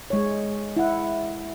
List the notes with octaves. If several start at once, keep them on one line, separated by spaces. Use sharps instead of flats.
G#3 C#5
E4 F#5